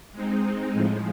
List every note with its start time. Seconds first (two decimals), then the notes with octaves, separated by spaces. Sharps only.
0.13 G#3 C4 D#4
0.73 A2 F3 G#3